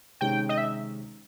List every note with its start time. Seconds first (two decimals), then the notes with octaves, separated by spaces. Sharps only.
0.21 C3 D#3 G#3 C#4 G5
0.49 D#5
0.58 E5